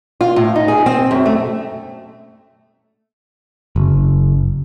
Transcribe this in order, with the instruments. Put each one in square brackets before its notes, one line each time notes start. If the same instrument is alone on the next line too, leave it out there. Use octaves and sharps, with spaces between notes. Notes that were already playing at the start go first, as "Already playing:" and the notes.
[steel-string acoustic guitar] F4
A2
D#4
G#4
C4
F#2
A3
[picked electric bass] F#1